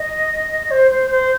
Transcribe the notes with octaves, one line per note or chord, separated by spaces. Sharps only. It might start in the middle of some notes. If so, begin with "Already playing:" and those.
Already playing: D#5
C5
C5
C5